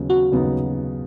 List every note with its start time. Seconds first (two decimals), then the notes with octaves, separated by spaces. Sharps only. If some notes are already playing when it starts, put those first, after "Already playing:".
Already playing: D#2 C#3 F#3 B3 D#4
0.10 F#4
0.31 D#2 C#3 F#3 B3 D#4